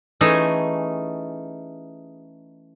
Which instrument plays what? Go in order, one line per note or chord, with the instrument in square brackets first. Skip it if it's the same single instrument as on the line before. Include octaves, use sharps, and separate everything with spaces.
[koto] E3 A3 C#4 D#4 G#4